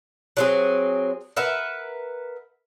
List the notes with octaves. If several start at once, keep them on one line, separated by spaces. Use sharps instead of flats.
F#3 C4 G#4
A#4 B4 E5 F#5